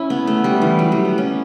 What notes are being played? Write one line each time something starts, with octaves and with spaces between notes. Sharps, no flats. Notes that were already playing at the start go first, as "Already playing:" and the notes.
Already playing: C#4 E4
B3
A3
G3
E3
F#3
G3
B3
C#4